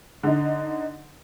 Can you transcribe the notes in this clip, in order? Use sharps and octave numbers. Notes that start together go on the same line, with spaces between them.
D3 D#4